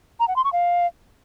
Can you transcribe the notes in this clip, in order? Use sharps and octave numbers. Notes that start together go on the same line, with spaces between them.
A#5
F#5
C6
C#6
F5